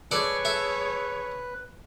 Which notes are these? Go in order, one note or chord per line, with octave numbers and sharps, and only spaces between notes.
G#4 A4 B4 C#5 D5
A4 E5